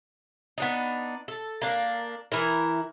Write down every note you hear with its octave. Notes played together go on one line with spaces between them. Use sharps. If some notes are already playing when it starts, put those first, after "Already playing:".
B3 D4 D#4
A4
A#3 D4
E3 E4 A#4